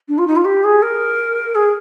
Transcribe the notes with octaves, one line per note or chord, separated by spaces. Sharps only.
D4
F4
D#4
F4
G4
G#4
A#4
G#4